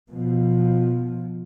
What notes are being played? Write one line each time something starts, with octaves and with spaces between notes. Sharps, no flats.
B2 F3